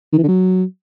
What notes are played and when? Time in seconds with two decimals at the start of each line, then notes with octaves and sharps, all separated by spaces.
0.13 D#3
0.18 E3
0.23 D3
0.28 F#3